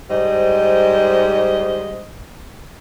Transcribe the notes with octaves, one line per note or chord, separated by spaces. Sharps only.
G#2 G3 C5 D#5